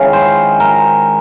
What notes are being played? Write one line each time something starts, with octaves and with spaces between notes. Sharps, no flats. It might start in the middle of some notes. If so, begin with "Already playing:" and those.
Already playing: D#3 G#3 C#4 E4 F5
C5
A#4